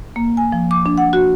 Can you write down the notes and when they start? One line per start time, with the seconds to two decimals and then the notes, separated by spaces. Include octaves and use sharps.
0.16 A#3
0.37 G#5
0.52 F3
0.71 D6
0.86 D4
0.98 F#5
1.13 F#4